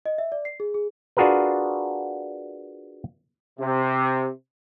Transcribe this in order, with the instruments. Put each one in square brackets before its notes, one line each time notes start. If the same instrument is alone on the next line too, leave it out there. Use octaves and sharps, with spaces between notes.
[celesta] D#5
E5
D5
C7
G#4
G#4
[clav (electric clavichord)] D4 F4 F#4 G#4 A#4 B4
[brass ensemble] C3